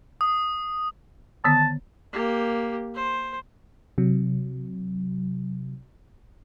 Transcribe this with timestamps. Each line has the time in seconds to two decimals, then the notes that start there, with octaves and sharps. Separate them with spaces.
0.21 D#6
1.44 D3 D#3 B3 A5
2.13 A#3 G4
2.94 C5
3.98 C3 F#3